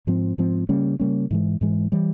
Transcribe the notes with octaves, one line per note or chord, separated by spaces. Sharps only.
G#2 F3 C4
G#2 F3 C4
C#3 G3 A#3 C#4
C#3 G3 A#3 C#4
G#2 E3 G#3
G#2 E3 G#3
E3 G3